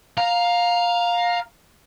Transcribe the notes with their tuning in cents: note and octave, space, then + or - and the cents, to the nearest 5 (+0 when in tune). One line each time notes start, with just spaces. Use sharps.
F5 +15 A#5 +0